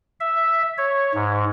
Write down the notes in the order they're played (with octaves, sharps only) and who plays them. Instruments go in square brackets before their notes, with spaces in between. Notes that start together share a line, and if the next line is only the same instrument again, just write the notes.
[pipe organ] E5
C#5
G#2